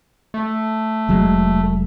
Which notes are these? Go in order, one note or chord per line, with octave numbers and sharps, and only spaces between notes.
A3
F1 F#3 G#3